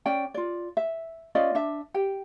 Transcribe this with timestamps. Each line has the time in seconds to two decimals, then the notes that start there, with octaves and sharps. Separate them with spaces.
0.06 C#4 D5 G5
0.34 F4 D5
0.77 E5
1.35 C#4 F4 D5 D#5
1.55 D4 E5
1.94 G4 G5